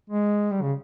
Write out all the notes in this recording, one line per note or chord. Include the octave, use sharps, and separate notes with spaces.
G#3
G3
C#3